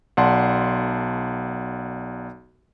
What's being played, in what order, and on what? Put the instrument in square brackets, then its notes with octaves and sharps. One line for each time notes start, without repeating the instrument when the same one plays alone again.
[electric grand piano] B1 D5 F#5 A5 C6